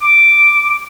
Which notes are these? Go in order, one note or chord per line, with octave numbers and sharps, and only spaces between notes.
D6